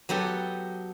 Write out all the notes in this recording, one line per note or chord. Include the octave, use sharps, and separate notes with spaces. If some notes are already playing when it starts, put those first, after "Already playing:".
F#3 B3 G4 A4